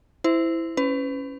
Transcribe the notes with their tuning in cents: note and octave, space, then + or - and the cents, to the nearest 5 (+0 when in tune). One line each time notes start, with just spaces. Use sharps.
E4 +0 C5 -20
C#4 +0 B4 +30